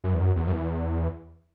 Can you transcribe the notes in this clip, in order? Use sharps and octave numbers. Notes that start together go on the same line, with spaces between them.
F#2
E2
F#2
E2
F#2
E2